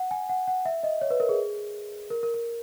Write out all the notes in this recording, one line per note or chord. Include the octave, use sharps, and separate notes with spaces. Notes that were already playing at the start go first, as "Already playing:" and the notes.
Already playing: F#5
G#5
F#5
F#5
E5
D#5
C#5
B4
A#4
G#4
A#4
A#4
A#4